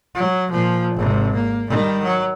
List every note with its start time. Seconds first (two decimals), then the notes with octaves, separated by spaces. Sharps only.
0.15 F#3
0.51 A#2 F3
0.94 G#1 C3
1.34 A#3
1.69 D#3 G3
2.04 F#3